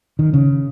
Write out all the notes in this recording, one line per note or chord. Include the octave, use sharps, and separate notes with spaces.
D#3
C#3